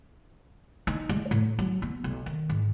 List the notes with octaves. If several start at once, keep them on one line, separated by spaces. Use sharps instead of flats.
D#4
G#3
A2
F#3
B3
B1
D#3
G#2